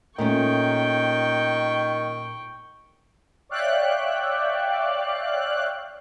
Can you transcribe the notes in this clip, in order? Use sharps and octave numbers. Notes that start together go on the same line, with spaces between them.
A#2 D#3 A3 C#4 G5 C#6
C#5 D5 E5 F5 G5 F#6